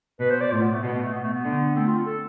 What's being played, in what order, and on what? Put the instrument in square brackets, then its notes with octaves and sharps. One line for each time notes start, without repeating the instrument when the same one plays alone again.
[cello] B2 [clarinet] B4
[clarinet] C5
D5
[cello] A2 [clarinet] F4
[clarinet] B3
A3
[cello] B2 [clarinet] B3
[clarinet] A3
B3
A3
B3
[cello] D3
[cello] A3 [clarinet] C4
[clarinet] F4
A4